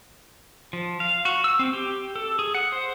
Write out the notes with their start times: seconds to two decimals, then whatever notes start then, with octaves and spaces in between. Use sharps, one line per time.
0.73 F3
1.00 F5
1.25 F#4
1.44 E6
1.59 C4
1.73 G4
2.16 A4
2.39 G#4
2.54 F#5
2.72 C5